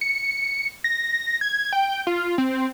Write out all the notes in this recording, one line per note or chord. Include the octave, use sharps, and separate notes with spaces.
C#7
A#6
G#6
G5
F4
C4